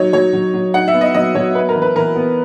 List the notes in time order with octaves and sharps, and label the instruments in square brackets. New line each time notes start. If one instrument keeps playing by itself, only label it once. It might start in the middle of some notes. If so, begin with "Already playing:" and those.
Already playing: [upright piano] F#3 D#4 C#5
F#3 C#5
F#3
F#3
D#4 F#5
E5
B3
D#5
F#3 D#5
F#3 C#5
B3 B4
A#4
E3
B4
E3 A#4
B3